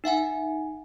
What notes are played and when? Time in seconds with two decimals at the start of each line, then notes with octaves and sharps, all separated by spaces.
0.04 D#4 E5 F#5 G#5